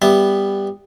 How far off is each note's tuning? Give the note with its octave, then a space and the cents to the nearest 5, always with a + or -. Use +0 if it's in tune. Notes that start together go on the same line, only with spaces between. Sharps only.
G3 +10 B3 +5 E5 +0